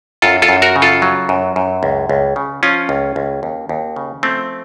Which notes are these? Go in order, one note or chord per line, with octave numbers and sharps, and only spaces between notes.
F#2 F4 A4
F4 A4
F#2
F#4 A#4
C#3
F4 A4
F#3
F#2
F#2
C#2
C#2
C#3
F3 C#4 F4
C#2
C#2
D#2
D#2
C#3
F3 A3 C4